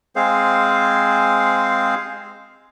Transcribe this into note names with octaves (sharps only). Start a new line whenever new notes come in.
G#3 C4 G#4 C5 F5